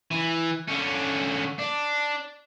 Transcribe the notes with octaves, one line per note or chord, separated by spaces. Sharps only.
E3
D3 C#4
D4